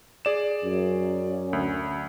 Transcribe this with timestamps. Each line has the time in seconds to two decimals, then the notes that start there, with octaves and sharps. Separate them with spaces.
0.25 G#4 D5 E7
0.64 F#2 C#4
1.53 D2